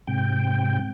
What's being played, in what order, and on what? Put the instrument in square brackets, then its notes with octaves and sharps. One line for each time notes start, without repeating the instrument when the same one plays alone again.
[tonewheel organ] G#2 C3 G5